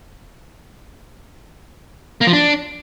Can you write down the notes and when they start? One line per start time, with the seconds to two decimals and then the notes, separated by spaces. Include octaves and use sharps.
2.21 A#3
2.27 F3
2.33 D4